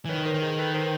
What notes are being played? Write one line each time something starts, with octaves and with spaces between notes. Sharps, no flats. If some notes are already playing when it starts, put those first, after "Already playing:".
E3
D#3 B4 C#5
A#4 C5
D#3
G#4 A#4
A4 B4
A#4 C5